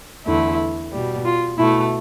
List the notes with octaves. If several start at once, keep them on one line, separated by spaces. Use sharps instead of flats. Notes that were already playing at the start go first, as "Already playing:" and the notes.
E2 D3 A3 E4
B2 G3
F4
B2 A3 E4